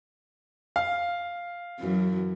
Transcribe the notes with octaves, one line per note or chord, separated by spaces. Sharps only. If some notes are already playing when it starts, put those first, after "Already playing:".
F5
F#2 E3 F#3